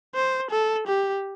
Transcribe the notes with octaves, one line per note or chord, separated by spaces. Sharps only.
C5
A4
G4